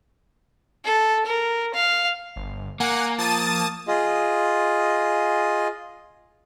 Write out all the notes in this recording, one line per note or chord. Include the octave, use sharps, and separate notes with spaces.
A4
A#4
F5
G1
A#3 F#5 G#5 A#5
F3 A5 D#6 A6
F4 G#4 D#5